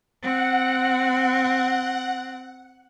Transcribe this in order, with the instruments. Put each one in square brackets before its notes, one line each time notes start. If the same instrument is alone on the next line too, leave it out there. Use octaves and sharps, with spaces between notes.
[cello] C4 [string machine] F#5